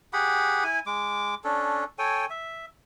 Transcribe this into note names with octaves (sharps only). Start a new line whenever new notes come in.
G4 G#4 F#5 B5
E4 G#5
G#3 D6
C#4 D4 A4
A4 C#5 G5 G#5
E5